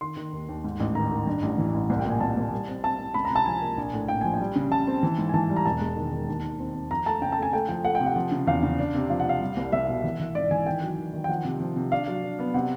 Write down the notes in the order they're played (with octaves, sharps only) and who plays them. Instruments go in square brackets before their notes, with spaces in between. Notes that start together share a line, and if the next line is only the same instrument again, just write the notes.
[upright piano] D#3 [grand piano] C6
[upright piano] D#3
D#2
D#2
G#2
A1
[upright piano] D#3 [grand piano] A#5
[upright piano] D#3
G2
A1
E3
A1
C2
[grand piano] G5
[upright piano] A#2
[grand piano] G#5
[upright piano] C2 [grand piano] A5
[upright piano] C2
G3
C4
[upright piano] C4 [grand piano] A5
[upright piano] C4
[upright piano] C#2 [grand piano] B5
[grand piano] A#5
[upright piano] C3
[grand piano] A5
[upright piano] F3 [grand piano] G#5
[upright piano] A#3
A#1
A2
[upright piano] A#1 [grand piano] G5
[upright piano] F3 [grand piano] G#5
[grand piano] G5
[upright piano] G3
C#3
[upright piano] C#3 [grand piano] A5
[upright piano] C4
E3
G#2
[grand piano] G#5
[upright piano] E3 [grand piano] A5
[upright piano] G3
[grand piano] A#5
[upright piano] E1 [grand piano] A5
[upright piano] G#3
D#3
D#3
D#2
D#3
C4
C4
[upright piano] F2 [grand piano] A#5
[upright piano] A3 [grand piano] A5
[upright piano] C#3 [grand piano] G5
[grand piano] A5
[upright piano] A3 [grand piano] G#5
[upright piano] A3 [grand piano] G5
[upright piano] F3 [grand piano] G5
[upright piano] A3 [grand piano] F#5
[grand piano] G5
[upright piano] C3
[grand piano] F#5
[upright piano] F3
C#3
[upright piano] E2 [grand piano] F5
[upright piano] C#3
D4
C3
[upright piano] F3 [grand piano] F5
[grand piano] F#5
[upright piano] C3 [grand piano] F5
[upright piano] G3
C2
[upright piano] C2 [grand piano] E5
[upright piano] B2
E3
E3
[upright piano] G#1 [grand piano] D5
[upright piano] E3 [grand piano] G#5
[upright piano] D#3 [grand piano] G5
[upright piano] F#3
D#3
D#3
[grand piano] G5
[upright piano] F3 [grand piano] F#5
[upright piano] C3
F3
C3
[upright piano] D4 [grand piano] F5
[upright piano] F#3
D4
B3
[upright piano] C3 [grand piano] F#5